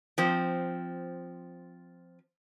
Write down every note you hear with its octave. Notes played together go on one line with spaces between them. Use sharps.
F3 C4